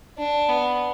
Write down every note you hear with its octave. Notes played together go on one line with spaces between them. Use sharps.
D4
B3